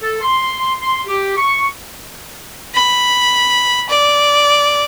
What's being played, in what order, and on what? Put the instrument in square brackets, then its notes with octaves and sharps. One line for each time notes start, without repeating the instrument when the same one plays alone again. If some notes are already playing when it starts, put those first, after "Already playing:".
[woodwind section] A4
C6
C6
G4
C#6
[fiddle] B5
D5